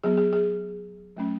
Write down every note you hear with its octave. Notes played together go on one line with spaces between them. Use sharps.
F#3 B3 G#4
G#4
G#4
F#3 A3 C#4